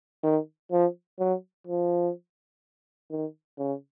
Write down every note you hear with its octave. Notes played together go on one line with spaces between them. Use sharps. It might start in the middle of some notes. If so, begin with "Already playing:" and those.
D#3
F3
F#3
F3
D#3
C#3